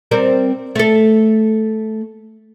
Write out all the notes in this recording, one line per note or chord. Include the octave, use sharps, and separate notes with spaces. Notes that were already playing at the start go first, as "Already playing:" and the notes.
G3 C4 A#4
A3 A4